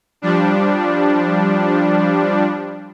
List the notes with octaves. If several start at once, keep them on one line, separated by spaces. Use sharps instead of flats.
F3 G3 D4